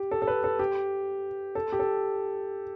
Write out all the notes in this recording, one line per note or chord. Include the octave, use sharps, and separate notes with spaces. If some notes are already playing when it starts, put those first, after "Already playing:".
Already playing: G4
A4
A4
B4
A4
G4
A4
G4
A4